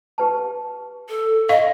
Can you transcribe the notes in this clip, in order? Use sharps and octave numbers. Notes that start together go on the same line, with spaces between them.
G4 B4 A5
A4
D#5 F5